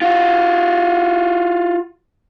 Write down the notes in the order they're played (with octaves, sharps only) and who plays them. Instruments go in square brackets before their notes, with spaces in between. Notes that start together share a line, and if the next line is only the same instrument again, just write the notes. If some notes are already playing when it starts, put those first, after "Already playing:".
[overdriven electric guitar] F4 F#4